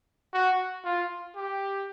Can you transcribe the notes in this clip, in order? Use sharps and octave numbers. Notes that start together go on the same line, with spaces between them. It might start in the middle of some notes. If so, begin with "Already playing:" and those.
F#4
F4
G4